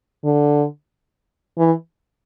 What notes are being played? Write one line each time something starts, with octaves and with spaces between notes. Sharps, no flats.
D3
E3